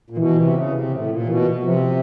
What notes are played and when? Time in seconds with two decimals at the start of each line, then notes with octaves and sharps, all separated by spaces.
0.10 A#2
0.17 B2 E3
0.36 C3
0.54 C#3
0.73 C3
0.91 A2
1.09 A#2
1.27 B2 E3
1.63 C3 F3